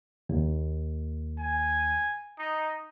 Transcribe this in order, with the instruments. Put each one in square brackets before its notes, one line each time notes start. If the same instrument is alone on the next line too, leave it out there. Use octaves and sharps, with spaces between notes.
[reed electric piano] D#2
[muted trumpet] G#5
D#4